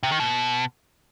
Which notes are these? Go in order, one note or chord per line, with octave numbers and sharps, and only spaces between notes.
C3
D#3
B2